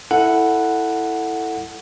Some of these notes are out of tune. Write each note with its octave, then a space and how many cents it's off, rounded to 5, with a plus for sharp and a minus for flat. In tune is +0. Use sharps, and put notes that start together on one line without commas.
E4 +0 A4 +10 F#5 +0